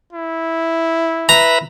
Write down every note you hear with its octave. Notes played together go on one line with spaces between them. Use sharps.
E4
B4 E5 A#5 B5